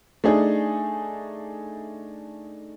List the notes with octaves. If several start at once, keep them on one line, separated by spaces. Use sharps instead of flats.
A3 D4 D#4 G#4